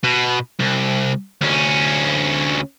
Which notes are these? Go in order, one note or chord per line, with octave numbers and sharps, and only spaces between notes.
B2
C2
D2 C#4